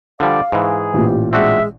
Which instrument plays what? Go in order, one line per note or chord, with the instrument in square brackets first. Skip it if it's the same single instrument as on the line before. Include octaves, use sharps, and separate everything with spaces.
[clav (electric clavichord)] D3 F3 G3 [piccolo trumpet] D5 [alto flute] F5
[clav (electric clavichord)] G#2 E3 [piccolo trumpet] G#4
[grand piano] A1 A#2 [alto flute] G4
[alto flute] G#3 [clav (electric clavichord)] C4 D4 F#4 [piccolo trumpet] E5